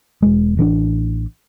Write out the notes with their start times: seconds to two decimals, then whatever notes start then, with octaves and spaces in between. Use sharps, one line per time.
0.22 E1 G#3
0.57 A1 E3 C4 D4